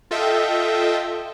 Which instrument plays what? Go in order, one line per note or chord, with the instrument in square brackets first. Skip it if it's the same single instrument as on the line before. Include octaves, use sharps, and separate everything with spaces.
[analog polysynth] F4 A4 D#5 E5 G5